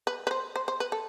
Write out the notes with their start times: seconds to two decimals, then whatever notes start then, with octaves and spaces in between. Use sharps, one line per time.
0.07 B4
0.27 B4
0.31 C5
0.56 C5
0.68 C5
0.80 B4
0.92 A4